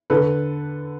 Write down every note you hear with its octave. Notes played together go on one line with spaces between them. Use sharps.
D3 A4 B4